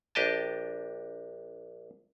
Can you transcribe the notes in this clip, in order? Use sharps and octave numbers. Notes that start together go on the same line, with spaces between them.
A#1 D4 G4 D#5 G5 A5